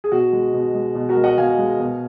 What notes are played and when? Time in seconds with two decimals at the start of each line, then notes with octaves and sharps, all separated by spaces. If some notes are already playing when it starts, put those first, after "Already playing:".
0.04 G#4
0.12 B2 F#4
0.33 G#3
0.54 B2
0.75 G#3
0.95 B2
1.09 F#4 A#4
1.17 G#3
1.24 D#5 F#5
1.38 B2 F5 G#5
1.59 G#3
1.80 B2